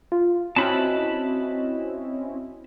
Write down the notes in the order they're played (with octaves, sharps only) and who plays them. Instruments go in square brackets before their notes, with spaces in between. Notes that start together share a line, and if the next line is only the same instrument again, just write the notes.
[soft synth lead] F4
[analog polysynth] C4 C#4 E4 [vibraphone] F#4 [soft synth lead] D#5 [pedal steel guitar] A5 B5